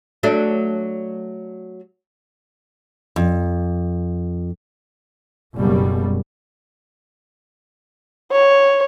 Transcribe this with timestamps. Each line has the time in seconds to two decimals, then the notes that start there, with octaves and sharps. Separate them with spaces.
0.23 F#3 A3 D4
3.16 F2
5.56 F#1 F#2 B2 G3
8.32 C#5